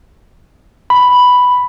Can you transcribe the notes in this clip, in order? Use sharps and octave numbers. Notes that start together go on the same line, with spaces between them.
B5